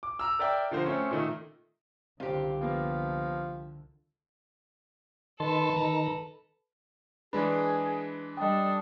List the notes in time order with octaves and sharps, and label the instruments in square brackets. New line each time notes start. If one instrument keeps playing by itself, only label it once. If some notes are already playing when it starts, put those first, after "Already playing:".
[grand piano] D6
A#5 E6
A#4 D5 E5 G5
D3 F3 A#3 C5
A3 C4 C#4
A#2 D#3 A3
[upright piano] F#1 C4 [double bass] C2 D3 [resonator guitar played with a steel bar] F4 G4
[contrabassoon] F3 [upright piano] A#3 B3
[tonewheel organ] D#3 A5 C6 [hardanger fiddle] A4 B4
[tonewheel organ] D#3 A#5
[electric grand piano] E3 G#3 D4 [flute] G#4 [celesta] B4 B5
[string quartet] G3 D4 A4 [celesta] D#5 G5 [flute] D#6